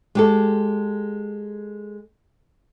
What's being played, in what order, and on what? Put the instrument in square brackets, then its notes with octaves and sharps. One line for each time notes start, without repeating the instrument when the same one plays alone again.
[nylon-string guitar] G#3 G4 A4